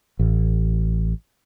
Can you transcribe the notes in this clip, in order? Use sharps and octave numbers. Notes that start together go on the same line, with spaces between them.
A1